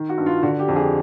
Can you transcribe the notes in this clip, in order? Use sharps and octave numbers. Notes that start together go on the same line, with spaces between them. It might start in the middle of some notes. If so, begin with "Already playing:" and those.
Already playing: D#3
F#4
G2
F4
D3 F#4
G4
F2
G#4